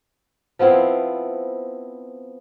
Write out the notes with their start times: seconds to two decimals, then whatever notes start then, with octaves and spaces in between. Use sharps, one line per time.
0.59 F3 B3 C4 E4